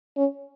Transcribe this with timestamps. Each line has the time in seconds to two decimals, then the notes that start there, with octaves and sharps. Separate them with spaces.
0.17 C#4